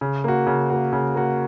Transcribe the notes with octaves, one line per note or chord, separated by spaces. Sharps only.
C#3
A#3 F#4
C#3
A#3 F#4
C#3
A#3 F#4